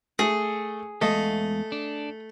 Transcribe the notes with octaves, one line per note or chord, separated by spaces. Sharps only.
A3 G#4
E2 G#3 A3 D#5 F5
D4